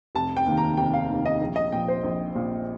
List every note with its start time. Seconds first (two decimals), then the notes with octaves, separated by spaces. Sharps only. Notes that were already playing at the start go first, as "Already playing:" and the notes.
0.15 F1 A5
0.37 G5
0.46 D#2 D#3 A#3
0.57 A#5
0.77 F1 G5
0.93 F5
1.10 D#2 D#3 A#3
1.26 D#5
1.41 A#1
1.56 D#5
1.72 A#2 F3 G5
1.88 C5
2.04 A#1
2.35 A#2 F3